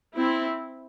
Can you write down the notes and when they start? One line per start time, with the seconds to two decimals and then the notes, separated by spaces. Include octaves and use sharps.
0.17 C4 E4